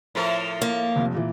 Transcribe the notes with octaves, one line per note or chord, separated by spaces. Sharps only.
A2 F3 A#4
A#3
F1 F2
A#2 E3